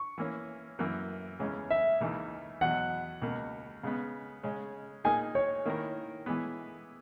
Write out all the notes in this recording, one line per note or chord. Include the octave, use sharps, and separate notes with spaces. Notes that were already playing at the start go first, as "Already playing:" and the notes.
Already playing: C#6
E3 A#3 C#4
F#2 E3 A#3
E2 C#3 E3 G#3 C#4
E5
C#2 C#3 E3 A#3 D#4
E2 B2 F#3 F#5
C#2 B2 A#3
C#3 G#3 B3
C#3 G#3 C#4
A#2 A#3 D#4 G#4 G#5
C#5
D#3 A#3 E4 A#4
E3 G#3 B3